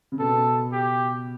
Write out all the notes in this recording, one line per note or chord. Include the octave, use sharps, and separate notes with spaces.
C#3
B2 A4
G4